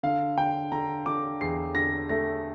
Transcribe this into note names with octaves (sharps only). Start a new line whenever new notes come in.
D3 F5
D3 G5
D3 A#5
D3 D6
E2 C7
D3 A#6
A3 A#6